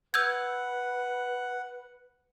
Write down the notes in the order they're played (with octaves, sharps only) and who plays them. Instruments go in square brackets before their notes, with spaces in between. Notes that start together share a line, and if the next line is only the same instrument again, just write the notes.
[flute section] B4 [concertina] F#5 [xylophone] E6 G6 G#6